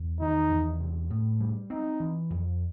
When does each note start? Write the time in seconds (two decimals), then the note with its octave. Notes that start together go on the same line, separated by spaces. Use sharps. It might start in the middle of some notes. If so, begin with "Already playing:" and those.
Already playing: E2
0.21 D#3 D#4
0.51 E2
0.80 C3
1.10 A2
1.41 G3
1.70 C4 D#4
2.00 E3
2.30 F2